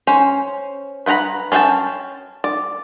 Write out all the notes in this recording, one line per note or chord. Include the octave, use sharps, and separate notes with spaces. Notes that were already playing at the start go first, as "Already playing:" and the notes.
C#4 C5
B4 F#5 G5 A#5 B5
C#4 D4 C5 G5 A5
D5